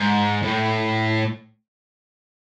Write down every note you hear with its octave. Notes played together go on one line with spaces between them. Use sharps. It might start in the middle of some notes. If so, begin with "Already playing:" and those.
Already playing: G#2
A2